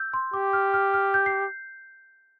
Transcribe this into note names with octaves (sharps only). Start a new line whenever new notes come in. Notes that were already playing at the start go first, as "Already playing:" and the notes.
Already playing: E6 G6
C6
G4 D6
F6
F6
F6
G6
C7